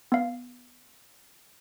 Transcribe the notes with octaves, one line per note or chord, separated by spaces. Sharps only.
B3 F5